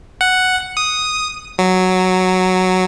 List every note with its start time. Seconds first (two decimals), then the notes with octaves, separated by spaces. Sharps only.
0.21 F#5
0.77 D#6
1.58 F#3